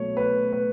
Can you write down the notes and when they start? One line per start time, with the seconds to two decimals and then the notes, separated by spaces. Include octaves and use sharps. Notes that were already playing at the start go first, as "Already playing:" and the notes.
Already playing: B2 F#3 A3 C#5
0.17 B4
0.53 B4